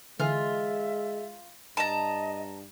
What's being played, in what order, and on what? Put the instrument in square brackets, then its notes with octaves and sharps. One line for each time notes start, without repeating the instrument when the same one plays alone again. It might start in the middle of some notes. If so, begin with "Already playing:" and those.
[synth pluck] D3 E3 G#5 [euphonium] G#3 [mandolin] F4 [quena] E5
[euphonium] G2 [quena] D#5 [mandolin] A5 A#5